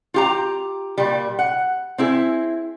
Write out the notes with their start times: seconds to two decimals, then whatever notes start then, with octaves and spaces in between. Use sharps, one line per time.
0.14 F4 G4 A#5
0.98 A#2 G3
1.39 F#5
1.98 C4 E4 G#4